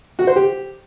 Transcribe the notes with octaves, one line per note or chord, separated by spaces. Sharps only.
F#4
C5
G4